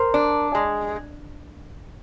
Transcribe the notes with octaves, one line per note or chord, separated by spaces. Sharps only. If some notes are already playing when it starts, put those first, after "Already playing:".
Already playing: A#4 C5
D4
G#3